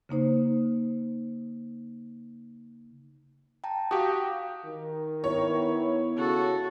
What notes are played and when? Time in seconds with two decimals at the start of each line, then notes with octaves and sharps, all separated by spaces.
0.09 C#3 A#3 D#4 C5
3.64 G5 A5 A#5
3.91 F#4 G4 F5 G5 D#6
4.66 D#3
5.24 B3 E4 C#5
6.17 C#3 F#4 A4